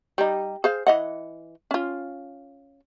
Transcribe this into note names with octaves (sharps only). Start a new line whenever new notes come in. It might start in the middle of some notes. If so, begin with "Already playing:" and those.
G3 D#4
G#4 C5 F5
E3 D#5 F#5
C#4 F4